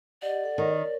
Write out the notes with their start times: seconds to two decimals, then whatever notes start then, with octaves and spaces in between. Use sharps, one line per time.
0.22 G4 D5 D#5 F#5
0.44 A4 F#5
0.58 D#3 A#4 C#5